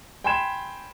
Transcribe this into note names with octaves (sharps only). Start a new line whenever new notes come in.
G5 G#5 B5 C6 G#6 E7